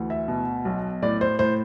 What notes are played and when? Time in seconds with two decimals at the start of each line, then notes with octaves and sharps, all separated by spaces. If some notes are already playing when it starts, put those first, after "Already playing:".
Already playing: D2 E3
0.10 E5
0.28 B2
0.65 B1
1.02 A2 D5
1.21 C5
1.39 A2 C5